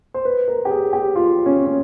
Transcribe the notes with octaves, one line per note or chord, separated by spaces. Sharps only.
C5
B4
A#4
G4
G#4
G4
F4
C#4
C#4